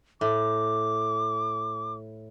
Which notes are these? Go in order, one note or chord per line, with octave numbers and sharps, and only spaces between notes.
A2 D6